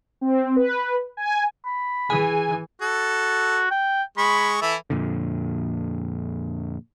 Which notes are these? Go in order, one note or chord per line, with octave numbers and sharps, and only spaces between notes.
C4
B4
G#5
B5
E3 G#4 G#5
F#4 A4
G5
G#3 B5 C#6
E3 E4 A4
F2 A#2 D3